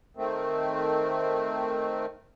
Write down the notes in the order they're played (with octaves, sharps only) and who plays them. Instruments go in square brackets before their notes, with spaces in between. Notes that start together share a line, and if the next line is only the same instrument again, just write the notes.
[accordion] D#3 A3 C4